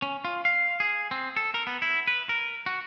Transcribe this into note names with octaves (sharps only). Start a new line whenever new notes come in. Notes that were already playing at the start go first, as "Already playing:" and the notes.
C#4
F4
F5
G#4
C4
A4
A#4
B3
E4
B4
A#4
F#4